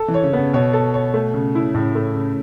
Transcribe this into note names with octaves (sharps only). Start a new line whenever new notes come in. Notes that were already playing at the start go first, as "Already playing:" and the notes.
Already playing: A4
E3
C#5
C#3
B3
C#3
B2 C#5
A4
C#5
A3
C#3
E4
A2 C#3
A3
C#3